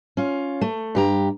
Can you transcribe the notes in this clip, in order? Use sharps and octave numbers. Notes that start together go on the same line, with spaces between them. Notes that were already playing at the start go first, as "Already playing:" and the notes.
C#4 F4
A3
G2 G4 A#5